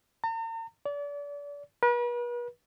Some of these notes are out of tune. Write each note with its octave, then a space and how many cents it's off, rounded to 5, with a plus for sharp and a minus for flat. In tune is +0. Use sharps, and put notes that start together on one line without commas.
A#5 -45
D5 -35
B4 -40